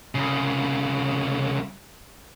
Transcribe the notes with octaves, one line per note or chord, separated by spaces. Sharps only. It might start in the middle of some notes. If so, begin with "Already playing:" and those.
C2 C#3